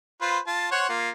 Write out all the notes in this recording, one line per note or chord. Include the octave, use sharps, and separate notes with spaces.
F4 B4 C5
F4 A5
C5 C#5 F#5
A#3 F4